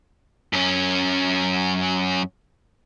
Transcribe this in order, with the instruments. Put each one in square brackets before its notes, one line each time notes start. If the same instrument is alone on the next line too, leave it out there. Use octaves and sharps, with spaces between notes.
[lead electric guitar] F#2 C#4